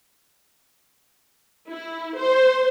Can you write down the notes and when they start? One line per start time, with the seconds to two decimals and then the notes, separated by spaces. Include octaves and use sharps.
1.71 E4
2.18 C5